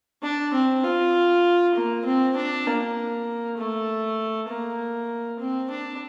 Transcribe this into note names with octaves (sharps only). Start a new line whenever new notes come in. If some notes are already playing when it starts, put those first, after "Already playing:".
D4
C4
F4
A#3
C4
D4
A#3
A3
A#3
C4
D4